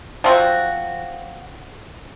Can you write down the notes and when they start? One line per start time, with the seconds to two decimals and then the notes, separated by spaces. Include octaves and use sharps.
0.24 F3 C4 F#4